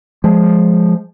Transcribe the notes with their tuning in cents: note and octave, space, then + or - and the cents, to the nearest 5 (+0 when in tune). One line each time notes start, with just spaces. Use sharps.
F3 +0 G#3 +0